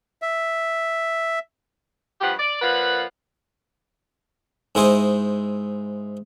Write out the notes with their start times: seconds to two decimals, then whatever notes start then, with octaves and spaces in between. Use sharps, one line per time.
0.22 E5
2.21 G2 F3 G4 B4 F#5
2.39 D5
2.61 A#2 F3 B4 F5 F#5
4.75 G#2 E4 G#4 C5 D#5